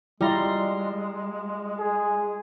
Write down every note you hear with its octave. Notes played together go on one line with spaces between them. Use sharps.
G3 G#3 E4 F4 A#5 C6
G#4